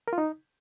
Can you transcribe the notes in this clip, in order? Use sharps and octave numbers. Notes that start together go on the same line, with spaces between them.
A#4
F4
D#4